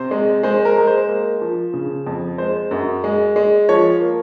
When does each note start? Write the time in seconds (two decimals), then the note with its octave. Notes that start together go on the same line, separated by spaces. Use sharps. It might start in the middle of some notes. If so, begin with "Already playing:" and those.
Already playing: C3 C5
0.11 G#3
0.43 G#3 C5
0.65 A#4
0.76 G#3
0.87 C5
1.08 A#3
1.41 F3
1.73 C#3
2.07 F2
2.38 G#3 C5
2.71 F#2
3.04 G#3
3.36 G#3
3.69 F3 C#5
4.01 A#3